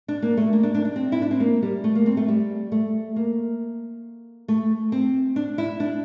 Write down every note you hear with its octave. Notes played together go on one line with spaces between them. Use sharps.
D4
A#3
A3
A#3
D4
D4
D4
C4
E4
D4
C4
A#3
G3
A3
A#3
C4
A3
G3
A3
A#3
A3
C4
D4
E4
D4